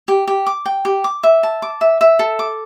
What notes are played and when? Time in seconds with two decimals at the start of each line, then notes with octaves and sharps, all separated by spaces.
0.08 G4
0.27 G4
0.47 D6
0.66 G5
0.85 G4
1.04 D6
1.23 E5
1.43 A5
1.62 D6
1.81 E5
2.01 E5
2.19 A4
2.39 D6